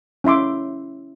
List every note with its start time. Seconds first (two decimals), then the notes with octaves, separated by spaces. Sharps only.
0.24 C#4 E4 E5 C6 D6